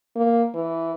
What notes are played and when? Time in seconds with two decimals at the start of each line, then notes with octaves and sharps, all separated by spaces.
0.15 A#3
0.54 E3